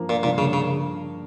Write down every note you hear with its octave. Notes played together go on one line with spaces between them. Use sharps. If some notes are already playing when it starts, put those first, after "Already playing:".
Already playing: G2 F3 A#3
A#2
G2 A#2 F3 A#3
C#3
C#3